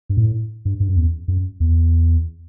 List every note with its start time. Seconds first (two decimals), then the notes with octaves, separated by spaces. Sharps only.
0.09 G2
0.17 A2
0.65 G2
0.80 G2
0.88 F#2
0.96 E2
1.28 F#2
1.60 E2